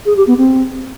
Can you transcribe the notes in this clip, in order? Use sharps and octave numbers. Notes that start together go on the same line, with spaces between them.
G#4
G4
B3
C4